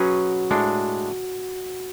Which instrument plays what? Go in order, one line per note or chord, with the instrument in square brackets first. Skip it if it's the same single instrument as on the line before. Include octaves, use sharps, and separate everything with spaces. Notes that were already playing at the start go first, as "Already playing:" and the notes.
Already playing: [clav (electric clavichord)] F#3 C#4 G#4 B4 [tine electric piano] F#4
[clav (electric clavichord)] A2 G#3 D4